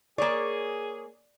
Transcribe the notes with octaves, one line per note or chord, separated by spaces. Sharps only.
A#3 G#4 C#5 D5